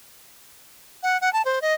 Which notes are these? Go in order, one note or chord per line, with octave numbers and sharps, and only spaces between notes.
F#5
F#5
A5
C5
D#5